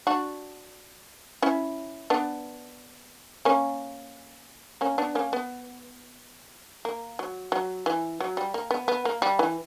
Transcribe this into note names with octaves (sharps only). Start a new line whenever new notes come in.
D4 F#4
C#4 E4
B3 D4
A#3 C#4
A#3 C#4
B3 D4
A#3 C#4
B3
A#3
F#3
F#3
E3
F#3
G3
A#3
B3
B3
A#3
G3
E3